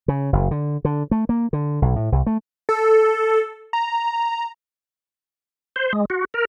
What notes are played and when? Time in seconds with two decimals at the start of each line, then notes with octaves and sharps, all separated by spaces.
0.08 C#3
0.33 F#1
0.51 D3
0.85 D3
1.11 A3
1.29 A#3
1.53 D3
1.82 B1
1.96 A2
2.12 C2
2.27 A3
2.69 A4
3.73 A#5
5.76 C5
5.93 G#3
6.10 F#4
6.34 A#4